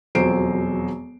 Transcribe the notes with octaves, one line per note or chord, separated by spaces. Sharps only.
E1 F2 F#3 C5 C7 D7